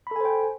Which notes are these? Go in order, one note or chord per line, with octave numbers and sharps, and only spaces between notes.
A4 C5 G5 G#5 B5